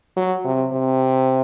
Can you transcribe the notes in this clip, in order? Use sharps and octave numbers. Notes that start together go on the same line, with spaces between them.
F#3
C3
C3